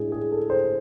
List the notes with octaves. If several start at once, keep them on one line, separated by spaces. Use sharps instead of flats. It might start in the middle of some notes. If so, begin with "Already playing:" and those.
Already playing: A2 G#3 D4 G#4
G#4
A4
C5